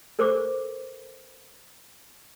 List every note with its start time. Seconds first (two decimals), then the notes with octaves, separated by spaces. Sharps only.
0.19 A4 A#4 C5 C#6 D6